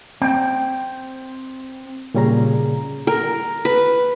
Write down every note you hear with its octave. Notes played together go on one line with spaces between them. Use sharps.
C4 G5
A#2 C#3 G3 C#4 G#4 A#5
A#4
B4